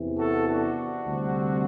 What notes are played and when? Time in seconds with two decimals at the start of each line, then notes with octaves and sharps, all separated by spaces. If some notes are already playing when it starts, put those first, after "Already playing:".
Already playing: E2 C3 E3
0.17 F#4 A4
0.47 D4 F#4
1.05 D2 C3 G3 C4